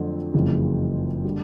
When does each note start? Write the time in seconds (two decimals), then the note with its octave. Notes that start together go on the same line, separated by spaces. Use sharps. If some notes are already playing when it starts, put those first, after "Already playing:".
Already playing: F2 D3 F#3 A3
0.34 F#1 F2 C#3 E3 G3
1.25 D3 G3